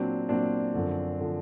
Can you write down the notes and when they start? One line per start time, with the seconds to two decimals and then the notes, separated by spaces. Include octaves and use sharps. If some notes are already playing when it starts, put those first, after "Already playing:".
Already playing: A#2 F#3 C4 D4
0.29 A#2 F#3 C4 D4
0.74 F#2 D3 F3
1.20 D3 F3